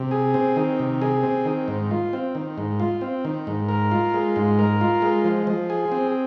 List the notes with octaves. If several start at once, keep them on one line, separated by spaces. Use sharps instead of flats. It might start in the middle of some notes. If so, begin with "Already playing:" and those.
Already playing: C3
G#4
C4
D#3
C3
G#4
C4
D#3
G#2
F4
C4
D#3
G#2
F4
C4
D#3
G#2
A#4
F4
G#3
G#2
A#4
F4
G#3
F3
F3
G#4
C4